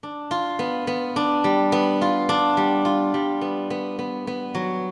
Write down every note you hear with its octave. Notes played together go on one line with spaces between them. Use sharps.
D4
F4
B3
B3
D4
G3
B3
F4
D4
G3
F4
G3
B3
B3
B3
B3
F#3